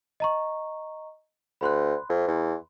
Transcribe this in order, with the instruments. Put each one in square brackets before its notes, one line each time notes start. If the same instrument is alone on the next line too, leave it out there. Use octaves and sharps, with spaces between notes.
[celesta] D#5 A#5 C#6
[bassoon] D2 [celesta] B5 C6 F#6
[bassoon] F2
E2